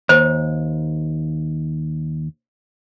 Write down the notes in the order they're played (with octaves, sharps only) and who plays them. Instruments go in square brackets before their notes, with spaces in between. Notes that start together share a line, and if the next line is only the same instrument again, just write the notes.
[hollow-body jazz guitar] D#2 [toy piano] C5